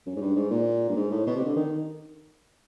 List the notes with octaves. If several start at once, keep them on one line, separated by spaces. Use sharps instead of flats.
F#2
G#2
G2
G#2
A#2
G2
G#2
A2
B2
C3
D3
D#3